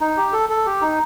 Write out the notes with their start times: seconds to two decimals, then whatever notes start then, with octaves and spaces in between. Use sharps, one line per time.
0.01 D#4
0.17 G4
0.33 A4
0.49 A4
0.66 G4
0.82 D#4